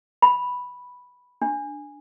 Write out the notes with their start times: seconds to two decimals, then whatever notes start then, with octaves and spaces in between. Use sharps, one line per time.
0.22 B5
1.42 D4